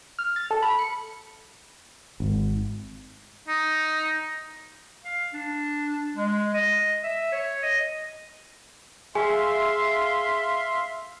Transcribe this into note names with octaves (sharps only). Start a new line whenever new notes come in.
F6
A6
A4
B5
C#7
G#1
D#4
F5
D4
G#3
D#5
E5
C#5
D#5
G#4 E5 F5 G#5 C6